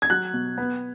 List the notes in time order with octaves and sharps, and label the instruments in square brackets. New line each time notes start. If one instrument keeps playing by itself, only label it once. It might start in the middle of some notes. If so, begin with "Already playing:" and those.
[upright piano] G#6
F#3 F#6
B2
B3